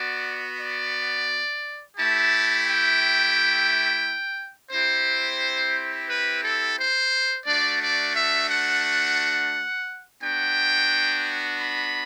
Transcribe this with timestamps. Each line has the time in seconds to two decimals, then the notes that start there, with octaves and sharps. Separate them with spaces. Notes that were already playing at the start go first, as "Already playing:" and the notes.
Already playing: B3 F#4 D5
0.59 D5
1.97 A3 E4 G4 A5
2.66 G5
4.71 C4 E4 G4 C5
6.09 B4
6.43 A4
6.78 C5
7.46 A3 D4 F#4 D5
7.81 D5
8.15 E5
8.49 F#5
10.21 B3 D4 F#4 G5
11.59 B5